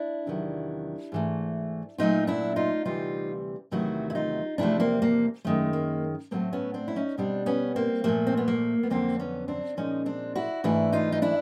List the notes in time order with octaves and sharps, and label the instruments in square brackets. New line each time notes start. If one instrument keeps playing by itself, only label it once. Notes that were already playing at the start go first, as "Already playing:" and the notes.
Already playing: [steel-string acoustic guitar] D4 E4
E2 C3 D#3 F#3
G#2 E3 A3
A#2 F#3 A3 D#4 F4
D4 E4
D#4 F4
D2 C3 E3 G3 D#4 F4
E2 C3 D#3 F#3 A3 E4 F#4
E4
D#4 F4
E2 C3 F3 A3 D4 E4
A#3 C4
A#3
F#2 D#3 G#3 A3
A#3
A2 F#3 A3 A#3 C4
B3 C#4
C4 D4
E4
C#4 D#4
B2 G3 C4 D4
B3 C#4
A#3 C4
A#2 F3 A3 A#3
C4
B3
A#3
B3
F2 D3 F#3 A#3 C4
B3 C#4
C4 D4
A#2 F3 G#3 C#4 D#4
C4 D4
E4 F#4
G#2 E3 A3 D4 E4
D#4 F4
D#4
D4 E4